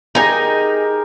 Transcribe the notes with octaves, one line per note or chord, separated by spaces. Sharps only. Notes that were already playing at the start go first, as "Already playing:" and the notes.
D#4 G4 G#4 A#4 G#5